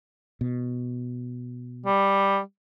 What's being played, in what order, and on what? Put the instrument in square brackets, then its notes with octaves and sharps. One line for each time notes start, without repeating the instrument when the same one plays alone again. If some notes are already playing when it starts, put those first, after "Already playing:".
[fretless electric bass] B2
[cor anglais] G3